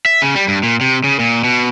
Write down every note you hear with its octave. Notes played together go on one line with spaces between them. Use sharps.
E5
C#3
G3
G2
A#2
C3
C#3
A#2
B2